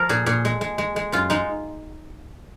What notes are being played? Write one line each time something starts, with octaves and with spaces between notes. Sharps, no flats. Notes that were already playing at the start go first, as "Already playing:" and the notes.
Already playing: F3 A#4
A#2 G#4
A#2 G#4
G#3
G#3
G#3
G#3
F#2 F4
G#3 D#4